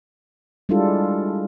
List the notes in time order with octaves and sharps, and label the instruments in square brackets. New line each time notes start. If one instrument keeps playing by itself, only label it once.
[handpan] G3 G#3 D4 E4 F4 A4